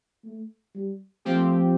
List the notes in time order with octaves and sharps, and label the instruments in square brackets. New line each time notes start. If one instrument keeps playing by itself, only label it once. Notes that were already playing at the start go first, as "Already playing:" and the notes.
[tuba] A3
G3
[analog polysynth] F3 C4 G4 [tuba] A3